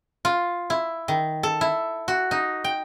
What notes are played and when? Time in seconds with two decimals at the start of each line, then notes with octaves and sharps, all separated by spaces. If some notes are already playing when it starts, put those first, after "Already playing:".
0.25 F4
0.70 E4
1.08 D#3
1.43 A4
1.61 E4
2.08 F#4
2.31 D#4
2.64 G5